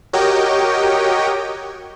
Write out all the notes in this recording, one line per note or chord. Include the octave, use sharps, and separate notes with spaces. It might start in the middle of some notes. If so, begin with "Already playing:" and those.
F#4 G4 A#4 C#5 D#5 G5